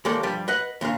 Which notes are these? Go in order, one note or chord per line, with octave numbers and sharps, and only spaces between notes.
D#2 G#3 A#3 G4 A4 D5
G2 F3 G3 G4
B4 D#5 F#5
D#2 A#2 D4 F5